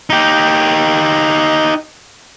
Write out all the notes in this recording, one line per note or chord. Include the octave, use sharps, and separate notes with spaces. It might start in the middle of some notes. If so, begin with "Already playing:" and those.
D#4 G4